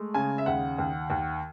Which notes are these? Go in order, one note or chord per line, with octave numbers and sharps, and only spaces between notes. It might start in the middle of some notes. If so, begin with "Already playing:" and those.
Already playing: G#3 A3
C#3 G#5
E5
D#2 F#5
D#2
D#2